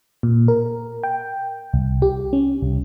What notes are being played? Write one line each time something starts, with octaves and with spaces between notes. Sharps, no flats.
A#2
A#4
G5
C2
G4
C#4
C2